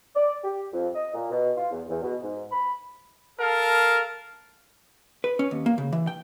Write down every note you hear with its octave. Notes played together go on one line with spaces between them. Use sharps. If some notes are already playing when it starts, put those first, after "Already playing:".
D5
G4
F2
D#5
A#2
B2
F4
E2
E2
B2
G#2
B5
A4 A#4 F5 A5
B4
C#4
D#2
A#3
C#3
E3
G5